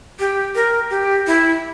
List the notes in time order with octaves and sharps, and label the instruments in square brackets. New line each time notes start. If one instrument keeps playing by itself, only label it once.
[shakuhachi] G4
A#4
G4
E4